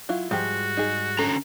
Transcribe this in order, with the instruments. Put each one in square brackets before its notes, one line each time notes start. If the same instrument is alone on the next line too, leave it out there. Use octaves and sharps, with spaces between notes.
[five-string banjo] F#3 E4 F4
[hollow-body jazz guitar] G#2 G3 G#3 [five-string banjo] F3 G4 [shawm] F#4
[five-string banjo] D#4 G#4
[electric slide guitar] D3 C#4 A#5 [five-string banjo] A4